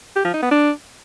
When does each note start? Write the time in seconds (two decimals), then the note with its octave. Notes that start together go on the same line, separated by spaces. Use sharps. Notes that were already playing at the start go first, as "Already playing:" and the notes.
0.16 G4
0.25 F3
0.34 D#4
0.43 B3
0.51 D4